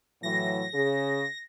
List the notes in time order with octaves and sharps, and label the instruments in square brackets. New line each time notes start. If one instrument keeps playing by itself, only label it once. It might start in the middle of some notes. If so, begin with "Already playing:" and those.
[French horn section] A2 E3 F#3 [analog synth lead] A#6
[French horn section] C#3 G#4